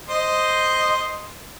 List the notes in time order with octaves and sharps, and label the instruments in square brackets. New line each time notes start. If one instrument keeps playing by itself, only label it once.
[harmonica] C5 D#5